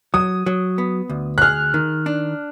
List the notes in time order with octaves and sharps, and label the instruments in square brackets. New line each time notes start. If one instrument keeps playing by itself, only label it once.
[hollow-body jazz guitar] F#3 [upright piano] D#6
[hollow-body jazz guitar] F#3
B3
D2
[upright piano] F#6
[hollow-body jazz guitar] G#4 [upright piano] F6
[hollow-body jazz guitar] D#3
D4